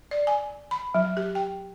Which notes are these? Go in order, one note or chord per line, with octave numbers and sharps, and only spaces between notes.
D5
G#5
B5
F#3
G4
G5